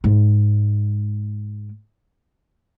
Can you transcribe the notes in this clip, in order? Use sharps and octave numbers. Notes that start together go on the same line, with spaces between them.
G#2 G#3